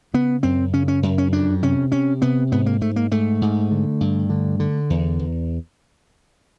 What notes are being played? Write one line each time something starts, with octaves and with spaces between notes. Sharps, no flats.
C#3 B3
F#2 C4
C#3 C#4
C#4
F#2
C#4
F2 D4
C3 C#4
C3 C#4
C3 B3
G#2 B3
A#3
G#2 A3
A#3
G#2 A3
G#2
D3
G2
D3
D3
E2
E2